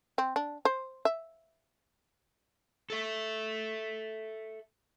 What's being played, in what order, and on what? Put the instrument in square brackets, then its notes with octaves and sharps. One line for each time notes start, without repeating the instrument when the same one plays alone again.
[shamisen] C4
D4
C5
E5
[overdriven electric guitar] A4 E5